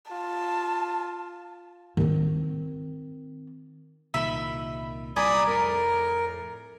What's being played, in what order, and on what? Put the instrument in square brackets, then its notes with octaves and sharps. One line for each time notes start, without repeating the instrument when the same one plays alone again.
[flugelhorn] F4 [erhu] A5
[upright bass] D#3 C4
[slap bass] C2 A#2 D#3 [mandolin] E5 B5
[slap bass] C2 A#2 [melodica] D5 B5 D#6 [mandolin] G#5 A#5
[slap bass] F2 A2 [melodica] A#4